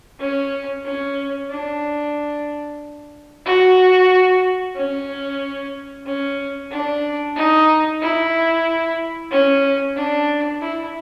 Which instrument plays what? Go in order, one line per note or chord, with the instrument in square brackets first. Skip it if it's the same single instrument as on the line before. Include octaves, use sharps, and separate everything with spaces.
[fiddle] C#4
C#4
D4
F#4
C#4
C#4
D4
D#4
E4
C#4
D4
E4